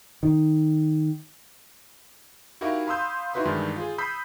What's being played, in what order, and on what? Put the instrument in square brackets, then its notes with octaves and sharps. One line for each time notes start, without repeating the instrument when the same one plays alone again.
[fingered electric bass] D#3
[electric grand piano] D#4 E4 F#4 G4 A#4 F5
F5 B5 C6 D#6 E6 G6
D#4 E4 F#4 B4 B5 C6
G2 D#3 E3 G#3
F4 G#4
B5 D#6 E6 G6 B6 C7